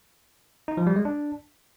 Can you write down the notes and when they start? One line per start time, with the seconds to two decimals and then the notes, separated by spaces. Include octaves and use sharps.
0.68 D#4
0.77 F3
0.87 G3
0.96 G#3
1.05 D4